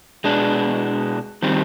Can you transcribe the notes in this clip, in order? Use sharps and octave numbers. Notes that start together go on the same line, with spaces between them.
B2 G#3 B3 D4
D#3 G3 C4